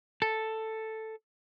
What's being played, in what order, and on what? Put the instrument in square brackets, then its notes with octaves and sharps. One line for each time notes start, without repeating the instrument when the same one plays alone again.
[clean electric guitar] A4